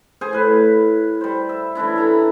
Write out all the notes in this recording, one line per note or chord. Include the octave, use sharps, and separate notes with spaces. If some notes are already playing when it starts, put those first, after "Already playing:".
G#4 C5 G#5
A2 B4
G3 C5
E5
E3 C#4 D4 E4
A4 A#5 B5